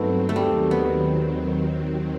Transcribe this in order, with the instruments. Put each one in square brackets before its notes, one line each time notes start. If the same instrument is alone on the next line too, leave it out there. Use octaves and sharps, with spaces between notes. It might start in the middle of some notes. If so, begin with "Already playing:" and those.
Already playing: [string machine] G2 F#3 C4 [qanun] A3 B3 D#4
[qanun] A3
[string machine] D#2 D#3 F#3 C4 [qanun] G3
[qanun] B3